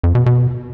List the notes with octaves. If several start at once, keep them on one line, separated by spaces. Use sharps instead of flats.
F2
B2
B2